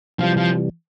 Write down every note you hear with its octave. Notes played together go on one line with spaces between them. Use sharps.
C3 E3 F3 G3
F3